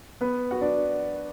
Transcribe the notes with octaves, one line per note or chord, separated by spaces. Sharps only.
B3 B4
F#4 F#5
D4 D5